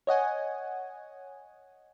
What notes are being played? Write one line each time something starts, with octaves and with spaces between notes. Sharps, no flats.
C#5 D#5 F#5 G#5